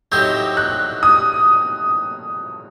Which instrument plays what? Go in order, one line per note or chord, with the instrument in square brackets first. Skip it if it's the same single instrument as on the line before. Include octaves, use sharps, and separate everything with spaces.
[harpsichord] A2 F#3 C4 D#4 G4 [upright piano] G6
[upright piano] F#6
D#6